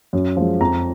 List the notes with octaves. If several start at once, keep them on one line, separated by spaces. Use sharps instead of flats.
F#2
F3 G#3
F2 A#5